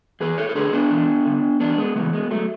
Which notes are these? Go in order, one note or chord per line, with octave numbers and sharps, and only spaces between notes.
E2 G#4 B4
A4 C#5
A4
D3 G#4 B4
B3 D4
E2
D3
E2 B3 D4
G#3 B3
C#3 E3 G#3 B3
G#3 B3
F#3 A3